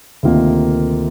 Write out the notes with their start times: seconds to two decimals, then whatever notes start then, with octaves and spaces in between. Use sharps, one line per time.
0.23 D2 C3 D#3 A#3 F4